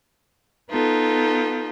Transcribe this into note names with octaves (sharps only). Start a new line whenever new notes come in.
B3 D#4 F4 A4